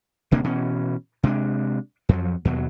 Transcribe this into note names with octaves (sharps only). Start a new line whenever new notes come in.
D1 C3 A#3 D4
B2 E3 C#4
C3 G#3 D4
F2 F3 F#3
D#2 B2 F#3